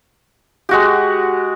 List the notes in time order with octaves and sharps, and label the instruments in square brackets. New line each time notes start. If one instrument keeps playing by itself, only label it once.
[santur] G#3 F#4 G4